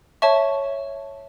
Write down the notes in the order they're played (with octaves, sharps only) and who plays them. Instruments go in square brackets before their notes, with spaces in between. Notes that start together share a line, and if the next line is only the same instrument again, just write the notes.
[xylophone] C#5 E5 A5 C#6